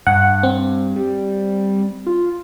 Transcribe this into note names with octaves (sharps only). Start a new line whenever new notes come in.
G2 F#5
C4
G3
F4